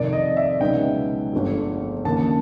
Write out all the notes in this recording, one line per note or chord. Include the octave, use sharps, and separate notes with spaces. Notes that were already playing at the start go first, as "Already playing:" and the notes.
Already playing: F2 C3 D#3 D5
D#5
E5
C#2 B2 F#3 B3 D#4 G5
G1 F2 D3 F3 A3
D#2 C#3 F3 A#3 A5